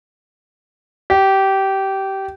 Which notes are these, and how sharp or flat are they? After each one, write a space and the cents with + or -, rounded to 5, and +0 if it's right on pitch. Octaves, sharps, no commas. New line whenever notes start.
G4 -20